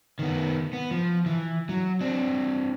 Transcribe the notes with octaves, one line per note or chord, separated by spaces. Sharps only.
D#3 B3
B3
F3
E3
F#3
C4 D4